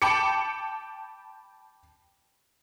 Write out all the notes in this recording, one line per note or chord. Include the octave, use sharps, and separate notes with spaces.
G5 A5 B5 D6 C#7